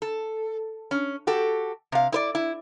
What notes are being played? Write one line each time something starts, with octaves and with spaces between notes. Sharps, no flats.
A4
C#4
F#4 G4 A4
C3 F5
E4 B4 D5
E4